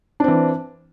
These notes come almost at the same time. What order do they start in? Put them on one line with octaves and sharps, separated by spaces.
D4 C4 E3